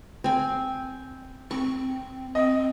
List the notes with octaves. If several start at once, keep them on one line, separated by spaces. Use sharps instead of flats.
C4 G#5
C4 C#6
C4 D#5